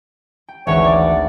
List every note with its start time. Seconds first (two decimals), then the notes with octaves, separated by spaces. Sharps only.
0.48 G5
0.67 G#1 D2 E3 B4 C#5 E5 F#5
0.85 D5